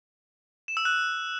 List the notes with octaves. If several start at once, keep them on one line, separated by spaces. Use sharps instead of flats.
E7
E6
F#6